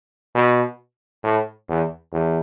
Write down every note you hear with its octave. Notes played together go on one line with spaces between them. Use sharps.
B2
A2
E2
E2